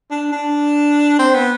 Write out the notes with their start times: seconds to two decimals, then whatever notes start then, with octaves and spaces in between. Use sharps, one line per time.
0.10 D4
0.32 D4
1.19 C4
1.34 B3